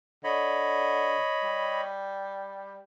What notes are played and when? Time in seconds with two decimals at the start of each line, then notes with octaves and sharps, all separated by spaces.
0.24 D3 C#5 D#5 B5
1.44 G3